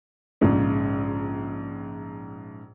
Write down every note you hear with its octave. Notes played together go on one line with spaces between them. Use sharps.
A#1 G#2 C#3